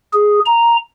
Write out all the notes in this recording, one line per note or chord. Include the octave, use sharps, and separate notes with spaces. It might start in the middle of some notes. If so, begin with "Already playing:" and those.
G#4
A#5